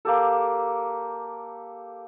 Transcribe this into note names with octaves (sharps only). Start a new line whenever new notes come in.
A#3 G4 A4